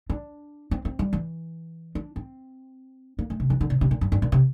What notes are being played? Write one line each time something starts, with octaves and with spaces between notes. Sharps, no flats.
D4
C4
C4
G3
E3
D4
C4
A#3
A3
C3
E3
D3
C3
C3
A#2
G2
G2
A#2
C3